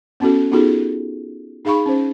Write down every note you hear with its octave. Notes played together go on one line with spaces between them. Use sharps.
B3 C#4 E4 F#4 A4
B3 D#4 F4 F#4 G#4 A4
D#4 G#4 F5 B5 C#6
C#4 C5